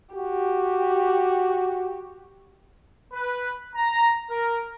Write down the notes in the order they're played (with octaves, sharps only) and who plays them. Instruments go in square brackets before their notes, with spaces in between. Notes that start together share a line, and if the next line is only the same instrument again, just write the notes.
[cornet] F#4 [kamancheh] G4
[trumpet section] B4
A#5
A#4